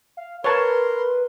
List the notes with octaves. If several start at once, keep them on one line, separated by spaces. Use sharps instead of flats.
F5
A#4 B4 C#5 A5 C6